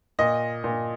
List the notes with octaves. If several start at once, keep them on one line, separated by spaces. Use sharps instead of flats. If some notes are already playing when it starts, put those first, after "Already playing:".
A#2 D#5
A#2